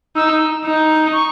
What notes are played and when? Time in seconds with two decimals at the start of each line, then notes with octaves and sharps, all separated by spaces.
0.16 D#4 E6
0.65 D#4
1.13 C#6